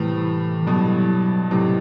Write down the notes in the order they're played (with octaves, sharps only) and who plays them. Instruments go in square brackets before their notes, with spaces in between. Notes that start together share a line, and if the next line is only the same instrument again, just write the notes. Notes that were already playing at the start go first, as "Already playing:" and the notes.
Already playing: [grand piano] A2 C3 G3 A3 B3 C4 [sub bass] E3
[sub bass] E3
[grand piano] G2 B2 [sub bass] F#3
[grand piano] A2 C3 [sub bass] F#3